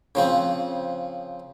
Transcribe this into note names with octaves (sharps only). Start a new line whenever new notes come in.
C#3 F3 C4